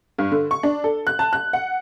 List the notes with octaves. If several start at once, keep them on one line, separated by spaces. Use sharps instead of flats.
G2
D3
C#6
D4
A4
F#6
A5
F#6
F#5